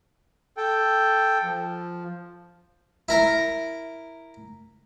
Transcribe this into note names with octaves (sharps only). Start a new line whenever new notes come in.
A4 G5
F3
E4 A#4 A#5